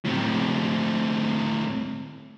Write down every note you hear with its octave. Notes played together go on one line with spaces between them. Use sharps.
A2 C4